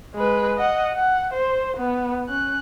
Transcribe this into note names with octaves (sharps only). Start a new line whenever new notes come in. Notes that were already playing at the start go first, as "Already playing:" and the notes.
G#3 B4
D#5 F#5
F#5
C5
B3
C#4 F#6